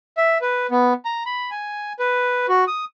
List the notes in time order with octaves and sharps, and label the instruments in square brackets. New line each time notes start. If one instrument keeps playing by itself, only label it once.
[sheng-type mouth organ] E5
B4
B3
A#5
B5
G#5
B4
F#4
D#6